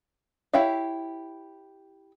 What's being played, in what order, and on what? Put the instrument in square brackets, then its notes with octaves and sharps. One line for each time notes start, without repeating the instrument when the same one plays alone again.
[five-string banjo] E4 G4 C#5 E5 F5